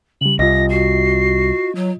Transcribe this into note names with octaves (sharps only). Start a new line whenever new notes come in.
C#3 G3 F#7
C2 F4 D#5 A#6
F#4 C7
F#3